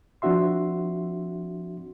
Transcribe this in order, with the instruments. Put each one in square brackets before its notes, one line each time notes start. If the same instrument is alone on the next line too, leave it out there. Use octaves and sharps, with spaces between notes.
[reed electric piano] F3 C4 D4 F#4 E5 C6